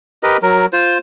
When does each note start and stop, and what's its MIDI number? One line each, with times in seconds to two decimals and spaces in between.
0.23 0.37 67
0.23 0.37 70
0.23 0.37 71
0.23 0.37 75
0.42 0.66 54
0.42 0.66 70
0.73 0.98 65
0.73 0.98 72